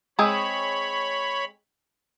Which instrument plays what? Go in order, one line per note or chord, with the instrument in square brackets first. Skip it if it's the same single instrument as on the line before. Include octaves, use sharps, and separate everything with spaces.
[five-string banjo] G#3 C4 G#4 [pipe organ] C#5 B5